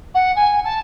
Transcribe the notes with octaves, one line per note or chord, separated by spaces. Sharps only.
F#5
G#5
A5